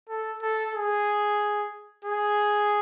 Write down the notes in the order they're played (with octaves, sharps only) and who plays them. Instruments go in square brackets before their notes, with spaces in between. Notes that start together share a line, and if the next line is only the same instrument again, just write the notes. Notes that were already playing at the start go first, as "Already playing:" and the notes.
[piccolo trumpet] A4
A4
G#4
G#4